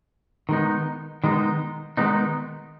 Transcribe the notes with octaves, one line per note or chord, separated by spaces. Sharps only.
D#3 G#3 B3 D#4
D#3 G#3 B3 D#4
D#3 G#3 B3 D#4